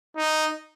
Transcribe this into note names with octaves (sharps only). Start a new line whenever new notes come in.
D#4